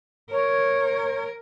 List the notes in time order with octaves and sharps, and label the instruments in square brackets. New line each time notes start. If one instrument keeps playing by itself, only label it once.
[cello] A#4 [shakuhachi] C#5